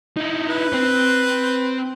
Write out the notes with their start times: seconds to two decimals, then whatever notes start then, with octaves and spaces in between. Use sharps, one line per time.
0.17 D#4 E4
0.50 B4
0.73 C4 C5